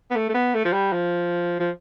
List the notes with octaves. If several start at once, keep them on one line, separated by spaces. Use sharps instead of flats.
B3
A3
A3
B3
A3
F3
G3
F3
F3